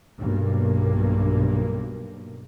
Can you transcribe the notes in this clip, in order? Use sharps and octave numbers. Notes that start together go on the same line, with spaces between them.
B1 G2 A#3